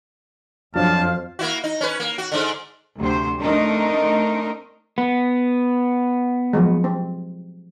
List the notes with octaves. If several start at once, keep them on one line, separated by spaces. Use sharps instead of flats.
F2 F#3 D4 C5 F5 A5 F6
A#3 E4 F#4
D#4
C#4 B4
A#3
F#4
G#2 D3
D2 C3 C5
A3 C4 D4 D#4 A#4 D#5
B3
F3 F#3 G#3
C4